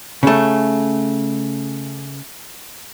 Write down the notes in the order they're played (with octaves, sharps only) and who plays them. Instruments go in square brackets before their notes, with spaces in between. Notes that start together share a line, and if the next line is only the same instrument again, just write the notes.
[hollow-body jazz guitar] C#3 A3